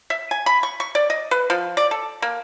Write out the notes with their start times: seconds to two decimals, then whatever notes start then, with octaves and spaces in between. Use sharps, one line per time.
0.10 E5
0.31 G#5
0.46 B5
0.63 C#6
0.80 C#6
0.95 D5
1.10 D#5
1.31 B4
1.50 F3
1.77 D5
1.91 A4
2.22 A#3